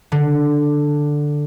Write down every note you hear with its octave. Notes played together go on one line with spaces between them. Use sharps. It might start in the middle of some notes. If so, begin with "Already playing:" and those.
D3